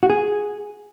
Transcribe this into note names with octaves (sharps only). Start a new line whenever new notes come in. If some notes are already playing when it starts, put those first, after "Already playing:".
F#4
G#4